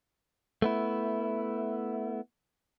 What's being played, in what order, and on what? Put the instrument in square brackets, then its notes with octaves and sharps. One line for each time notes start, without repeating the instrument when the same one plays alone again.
[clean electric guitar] A3 B3 E4